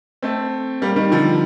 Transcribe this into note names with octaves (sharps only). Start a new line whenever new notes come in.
A3 C4
G3 A#3
D#3 G3
D3 F3